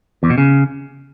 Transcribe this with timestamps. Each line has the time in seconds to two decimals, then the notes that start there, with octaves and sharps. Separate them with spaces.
0.23 E2
0.30 B2
0.38 C#3